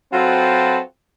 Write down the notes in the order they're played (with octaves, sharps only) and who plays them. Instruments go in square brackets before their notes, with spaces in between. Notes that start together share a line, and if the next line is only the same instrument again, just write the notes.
[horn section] F#3 C4 F4 F#4 A4 B4